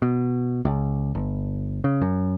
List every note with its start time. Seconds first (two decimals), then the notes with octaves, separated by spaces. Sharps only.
0.02 B2
0.65 C#2
1.15 G1
1.84 C#3
2.01 F#2